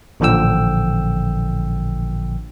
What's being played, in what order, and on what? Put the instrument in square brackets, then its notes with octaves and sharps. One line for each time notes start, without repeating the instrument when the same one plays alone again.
[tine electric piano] A1 A#2 D3 F3 G5 E6